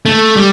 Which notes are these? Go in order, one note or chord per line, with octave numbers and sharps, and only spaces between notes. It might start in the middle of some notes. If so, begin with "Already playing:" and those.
A3
G3